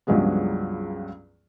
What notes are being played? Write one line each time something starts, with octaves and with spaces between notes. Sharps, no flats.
C#2 G2 F3 F#3 G#3 B3